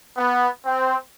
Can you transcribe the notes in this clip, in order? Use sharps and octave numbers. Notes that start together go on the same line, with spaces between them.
B3
C4